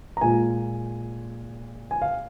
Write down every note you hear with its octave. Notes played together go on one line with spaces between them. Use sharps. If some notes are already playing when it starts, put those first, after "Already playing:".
A#5
A#2 G#3 F4 G#5
G#5
F5